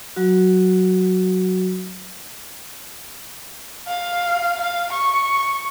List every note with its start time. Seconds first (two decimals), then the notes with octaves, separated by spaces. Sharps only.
0.16 F#3 F#4
3.87 F5
4.61 F5
4.93 C#6